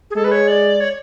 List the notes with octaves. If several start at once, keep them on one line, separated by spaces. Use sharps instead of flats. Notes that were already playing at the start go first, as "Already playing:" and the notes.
G#4
G#3 A4
B4
C#5
D5
C#5